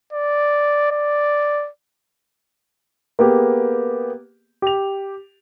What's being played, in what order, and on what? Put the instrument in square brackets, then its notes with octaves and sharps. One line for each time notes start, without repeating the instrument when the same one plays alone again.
[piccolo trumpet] D5
D5
[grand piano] A#3 B3 G4 G#4
G4 F7